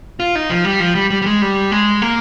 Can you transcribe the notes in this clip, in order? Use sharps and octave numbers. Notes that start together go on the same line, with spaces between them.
F4
D#4
F3
G3
F3
G3
G3
G3
G#3
G3
G#3
A#3